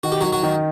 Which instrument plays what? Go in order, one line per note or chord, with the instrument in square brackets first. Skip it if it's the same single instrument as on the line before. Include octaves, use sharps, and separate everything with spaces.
[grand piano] D#3 [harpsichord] F#4
[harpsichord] G4
[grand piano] D#3 [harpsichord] F#3 F#4
[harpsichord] F#3 F#4
[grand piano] D#3